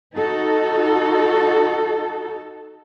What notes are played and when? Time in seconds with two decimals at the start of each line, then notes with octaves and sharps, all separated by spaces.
0.16 D#4 F#4 A4